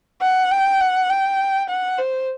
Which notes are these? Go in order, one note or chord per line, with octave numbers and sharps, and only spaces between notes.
F#5
G5
F#5
G5
F#5
C5